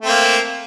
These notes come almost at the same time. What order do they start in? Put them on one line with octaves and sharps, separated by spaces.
A3 C4 A#3